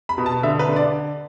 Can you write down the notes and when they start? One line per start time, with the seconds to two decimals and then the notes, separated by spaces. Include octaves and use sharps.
0.09 B5
0.18 B2
0.26 A5
0.43 D3 E5
0.59 B4
0.68 D3
0.76 D5